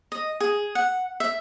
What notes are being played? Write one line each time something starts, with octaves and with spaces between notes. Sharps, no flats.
D#5
G#4
F#5
E5